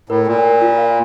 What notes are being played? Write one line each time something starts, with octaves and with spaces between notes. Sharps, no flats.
A2 A#4
A#2 G5
A#4
F4
F5